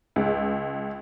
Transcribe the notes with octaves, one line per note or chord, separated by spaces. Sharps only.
C#2